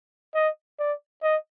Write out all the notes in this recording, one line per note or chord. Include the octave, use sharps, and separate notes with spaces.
D#5
D5
D#5